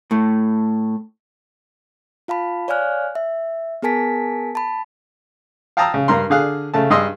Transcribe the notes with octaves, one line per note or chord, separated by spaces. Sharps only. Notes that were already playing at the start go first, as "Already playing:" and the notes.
A2 A3
F4 F5 A5 B5
C#5 D5 F5 G#5 F6 F#6
E5
B3 G#4 A#4 G#5 A5 B6
A5 B5
F5 G5 A5 A#5 D#6 E6
C#3
G2 A#4 A#5 C6
D3 G#4 F5 F#6
C#3 A3 A5
G2 G#4 D#5 C6 E6